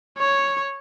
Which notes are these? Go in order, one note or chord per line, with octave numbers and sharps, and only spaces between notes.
C#5